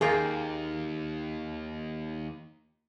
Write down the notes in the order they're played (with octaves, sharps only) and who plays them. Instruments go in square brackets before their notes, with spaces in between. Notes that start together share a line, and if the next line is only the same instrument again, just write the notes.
[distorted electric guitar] D#2 [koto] A#3 F4 G5 [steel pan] G#4